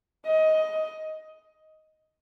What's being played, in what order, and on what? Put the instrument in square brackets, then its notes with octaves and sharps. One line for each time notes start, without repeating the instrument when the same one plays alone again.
[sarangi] D#5